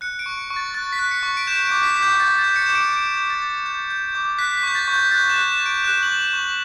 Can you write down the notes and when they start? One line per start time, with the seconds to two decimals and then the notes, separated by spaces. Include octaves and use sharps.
0.01 F#6 C#7
0.19 D7
0.26 C#6
0.38 C#7
0.50 C#6
0.56 A6
0.74 F#6 A6
0.93 B6
0.99 F#6
1.11 C#7
1.23 C#6
1.37 D7
1.47 G6 E7
1.65 D7
1.71 D6
1.83 B6
1.96 D6
2.02 G6
2.19 G6 A6
2.39 A6
2.44 G6
2.56 C#7
2.66 D6 E7
2.75 D7
2.93 G6 D7
3.17 D6
3.30 A6
3.42 D6
3.66 G6
3.90 G6
4.15 D6
4.38 F#6 B6
4.57 B6
4.63 C#6 G6
4.75 A6
4.88 C#6
4.94 G6
5.11 F#6 A6
5.29 E7
5.36 F#6
5.48 E7
5.60 C#6
5.66 D7
5.84 F#6 E7
6.03 F#7
6.08 C#6
6.21 E7
6.33 C#6
6.39 F#7